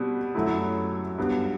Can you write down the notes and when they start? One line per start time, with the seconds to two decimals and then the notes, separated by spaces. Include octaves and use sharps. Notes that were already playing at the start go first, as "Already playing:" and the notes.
Already playing: B2 G3 C4
0.35 F#2 F#3 A3 E4
1.18 G2 F#3 B3